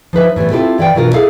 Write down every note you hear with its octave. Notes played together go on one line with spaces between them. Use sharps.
F3 D#4 B4 E5
A2 E3 G3 B3
C4 E4 F4 G4 A4
E3 D5 F5 G5
B2 E3 F#3 D4 F4 A#4
D#4 E4 G#4 A4 F5